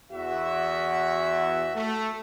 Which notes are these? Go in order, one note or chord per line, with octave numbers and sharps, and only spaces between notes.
E2 F#4 E5
A3